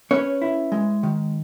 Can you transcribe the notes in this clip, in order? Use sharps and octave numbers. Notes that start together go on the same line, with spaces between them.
C#4 B4 C#5
E4
G#3
D#3